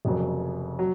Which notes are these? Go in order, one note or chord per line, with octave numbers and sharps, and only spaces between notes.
F1 F2 C#3 F#3 A#3
F#3